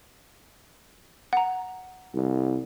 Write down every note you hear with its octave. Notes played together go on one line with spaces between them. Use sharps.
F#5 A#5
C2